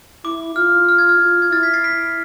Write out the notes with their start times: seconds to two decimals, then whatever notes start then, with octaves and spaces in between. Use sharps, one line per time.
0.24 E4 D6
0.56 F4 F6
0.89 F6
0.98 G#6
1.09 F6
1.20 F4
1.42 G#6
1.52 E4 F6 A6
1.63 G#6 B6
1.73 A6 C7
1.84 B6 D7